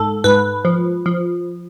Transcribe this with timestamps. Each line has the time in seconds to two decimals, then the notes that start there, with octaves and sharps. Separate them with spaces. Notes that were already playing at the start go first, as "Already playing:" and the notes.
Already playing: G#2 A4
0.24 G#2 B4
0.65 F3
1.06 F3